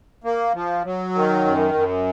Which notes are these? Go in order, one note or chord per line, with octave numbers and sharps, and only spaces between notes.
A#3
F3
F#3
D#3
F#2
F#2